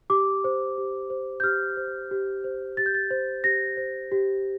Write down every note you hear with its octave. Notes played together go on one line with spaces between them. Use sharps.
G4 D6
C5
G4
C5
G6
G4 F6
C5
G4
C5
G4 A6
G6
A6
C5
G4 A#6
C5
G4